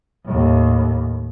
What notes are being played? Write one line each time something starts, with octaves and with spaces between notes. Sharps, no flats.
D#2 A2